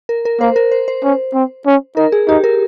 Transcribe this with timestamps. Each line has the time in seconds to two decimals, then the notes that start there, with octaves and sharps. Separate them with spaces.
0.09 A#4
0.25 A#4
0.40 A#3 C5
0.56 A#4
0.72 C5
0.88 C5
1.03 C#4
1.34 C4
1.66 C#4
1.97 D#4 A#4
2.12 G#4
2.28 D#4 G4
2.44 A#4